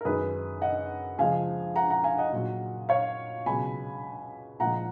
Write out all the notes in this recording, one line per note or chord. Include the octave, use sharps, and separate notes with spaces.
A#4
F#2 D#3 G#3 G#4 B4
D#5 F#5
C#2 C#3 F3 G#3 F5 G#5
F#5 A#5
F#5 A#5
F5 G#5
D#5 F#5
A#2 F#3
C#5 F5
C#2 B2 F#3 G#5 B5
A#2 F3 G#3 F#5 A#5